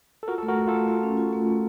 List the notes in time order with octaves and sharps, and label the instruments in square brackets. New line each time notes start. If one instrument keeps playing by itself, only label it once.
[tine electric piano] A4
[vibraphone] F4 [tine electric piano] F#4 A#4
[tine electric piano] A4
[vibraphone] A3
[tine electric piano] F#4 A#4
[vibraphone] A3
[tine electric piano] F4 A4
[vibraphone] A3
F4
C#4
F4
A3
A3